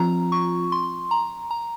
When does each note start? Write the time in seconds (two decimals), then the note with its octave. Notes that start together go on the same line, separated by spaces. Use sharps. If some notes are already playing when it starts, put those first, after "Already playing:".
Already playing: F3 C4 F4 A#5
0.32 C#6
0.72 C6
1.11 A#5
1.51 A#5